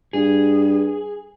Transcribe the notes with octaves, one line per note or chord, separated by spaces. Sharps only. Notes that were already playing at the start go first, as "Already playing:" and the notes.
G2 G#4